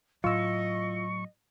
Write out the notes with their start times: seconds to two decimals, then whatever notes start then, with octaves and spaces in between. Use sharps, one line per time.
0.24 A2 F#3 F4 D#5 C#6 E6